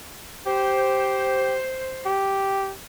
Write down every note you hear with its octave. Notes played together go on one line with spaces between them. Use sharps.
G4 C5
G4